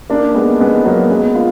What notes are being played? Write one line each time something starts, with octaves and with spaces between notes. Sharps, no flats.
A#3 D4
G#3 B3
G#3 B3
F#3 A#3
G#3 B3
D4 F4